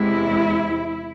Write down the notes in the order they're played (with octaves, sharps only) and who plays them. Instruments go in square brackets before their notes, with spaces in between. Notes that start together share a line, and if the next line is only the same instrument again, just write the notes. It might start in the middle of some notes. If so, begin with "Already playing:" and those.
Already playing: [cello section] E2 C3 G#3 E4